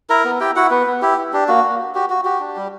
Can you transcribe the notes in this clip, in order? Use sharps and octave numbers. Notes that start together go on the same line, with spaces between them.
E4 A#4 A#5
B3
E4 G4 G5
E4 F#4 F#5
B3 B4
B3
E4 G4
E4
D4 G4
A#3 F#4
A#3
F#4
F#4 G4
F#4
F#4 G4
D4
G3